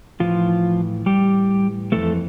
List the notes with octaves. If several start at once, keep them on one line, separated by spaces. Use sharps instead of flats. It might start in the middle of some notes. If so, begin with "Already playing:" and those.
A2 E3 F3 F4
G3 G4
F2 C3 E3 A3 A4